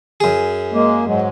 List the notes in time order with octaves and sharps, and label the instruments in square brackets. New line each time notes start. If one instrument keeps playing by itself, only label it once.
[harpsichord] F#2 G#4
[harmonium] G#3 A#3
G#2 F#3 G#3